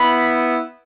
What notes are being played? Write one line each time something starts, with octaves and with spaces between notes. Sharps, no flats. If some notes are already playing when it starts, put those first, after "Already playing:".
Already playing: B3 E4 B5